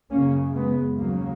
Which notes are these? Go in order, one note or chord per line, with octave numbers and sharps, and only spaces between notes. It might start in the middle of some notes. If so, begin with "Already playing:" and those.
F#2 C#3 A#3 C#4
G#3 B3
D#2 C#3 F#3 A#3